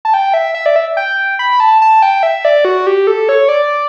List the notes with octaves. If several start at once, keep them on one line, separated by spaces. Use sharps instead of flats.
A5
G5
E5
E5
D5
E5
G5
B5
A5
A5
G5
E5
D5
F#4
G4
A4
C#5
D5